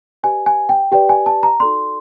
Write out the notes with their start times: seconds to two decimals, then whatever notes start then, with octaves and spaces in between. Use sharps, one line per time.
0.23 G4 B4 D5 G#5
0.46 G#5
0.69 G5
0.92 G4 B4 D5 G5
1.09 G#5
1.26 A5
1.43 A#5
1.60 D#4 F#4 A4 D5 C6